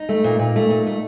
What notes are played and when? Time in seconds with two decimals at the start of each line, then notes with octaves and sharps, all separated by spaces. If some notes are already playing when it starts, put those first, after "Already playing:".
Already playing: D#4
0.09 A3
0.24 A#2
0.39 A#2
0.56 A3
0.70 A#2
0.87 A3